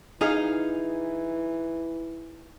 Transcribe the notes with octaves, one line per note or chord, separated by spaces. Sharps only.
E3 D#4 G#4 F5